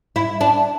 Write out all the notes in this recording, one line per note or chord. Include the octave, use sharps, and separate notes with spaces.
E4
D4